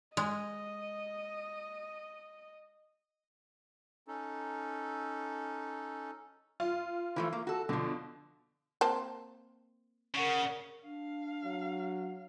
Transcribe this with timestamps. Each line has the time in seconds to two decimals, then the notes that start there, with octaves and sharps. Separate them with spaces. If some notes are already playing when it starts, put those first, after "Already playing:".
0.17 G#3 D#5
4.08 C#4 D#4 A4
6.60 F4
7.16 E3 F3 A3
7.33 A#3
7.47 F#4 A4
7.69 B2 D3 F3
8.81 A#3 C4 A5
10.14 C#3 A#4 F#5 C#6
10.83 D4 F5
11.44 F#3